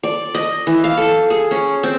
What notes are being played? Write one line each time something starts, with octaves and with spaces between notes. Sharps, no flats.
D5
D#5
E3
F5
A4
G#4
C#4
C4